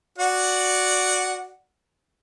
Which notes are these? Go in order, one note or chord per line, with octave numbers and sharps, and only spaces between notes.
F#4 D5 F#5